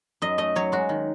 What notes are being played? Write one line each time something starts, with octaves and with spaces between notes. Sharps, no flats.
F#2 D#5
A3 D#5
F#3 C#5
G#3 F#4
D#3